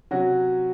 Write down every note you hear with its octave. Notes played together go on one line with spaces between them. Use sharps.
C3 F#3 C#4 F#4